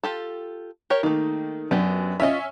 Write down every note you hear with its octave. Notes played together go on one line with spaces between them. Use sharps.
F4 G4 A4
G4 A#4 C#5
D#3 A3 A#3
F#2 B3 D4 G4
C#4 F4 D#5 E5